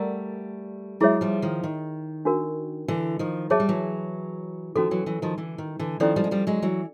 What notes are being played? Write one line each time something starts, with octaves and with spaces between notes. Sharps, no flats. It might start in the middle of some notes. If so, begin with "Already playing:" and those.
Already playing: G3 A3 A#4 D5 F#5 A#5
F#3 G#3 E4 G#4 C#5 E5
F3 G3
D#3 F3
D#3
D4 F#4 A#4
D3 E3
D#3 F3
F#3 G#4 C#5 E5 A5
G3
E3 F#3
D#3 F3 C#4 F#4 A4
E3 F#3
E3 F#3
D#3 F3
D3 E3
D#3
D3 E3
D#3 F3 C#4 E4 A4 D5
F3 G3
G#3
F3 G3
F#3 G#3
E3 F#3